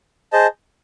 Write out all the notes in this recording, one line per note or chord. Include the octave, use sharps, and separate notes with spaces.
G#4 C5 D#5 A5